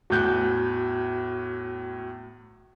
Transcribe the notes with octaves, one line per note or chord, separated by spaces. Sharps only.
E2 A2 F#4 F#6 G6